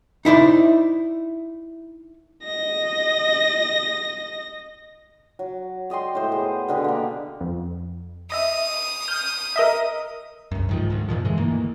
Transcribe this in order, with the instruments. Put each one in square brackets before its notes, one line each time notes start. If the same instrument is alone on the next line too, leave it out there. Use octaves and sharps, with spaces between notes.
[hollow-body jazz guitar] D#4 E4 C5 D5
[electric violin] D#5 A#6
[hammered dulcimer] F#3
D5 D#5 G5 C6
A2 C5
B3 G#4
B2 D3 G4
A#3 D4
[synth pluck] F2
[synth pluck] D#5 E5 [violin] D#6
[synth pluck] F6 G6
A#4 D#5 E5
[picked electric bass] C2 F#2
G#2 D#3 F3
D2 G#2
F#2 A#2 D#3 F3
G2 D3 E3 G#3
D2 D#3 E3 A#3